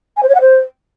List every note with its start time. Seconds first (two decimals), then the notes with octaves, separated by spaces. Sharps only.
0.17 G#5
0.23 C5
0.29 C#5
0.35 F#5
0.41 C5